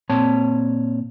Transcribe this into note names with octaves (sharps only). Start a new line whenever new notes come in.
A#2 C4 C#5 A5